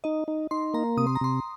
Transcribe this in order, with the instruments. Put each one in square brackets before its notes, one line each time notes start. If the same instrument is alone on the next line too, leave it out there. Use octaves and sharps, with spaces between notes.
[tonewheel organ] D#4 [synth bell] D#5
[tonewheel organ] D#4
[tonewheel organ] D#4 [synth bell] C6
[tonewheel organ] A#3 [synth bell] A#5
[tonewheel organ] C3 [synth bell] D#6
[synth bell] C6
A#5
[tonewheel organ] C3 [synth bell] C6